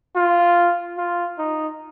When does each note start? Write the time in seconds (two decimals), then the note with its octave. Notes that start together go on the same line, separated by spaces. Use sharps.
0.16 F4
0.97 F4
1.39 D#4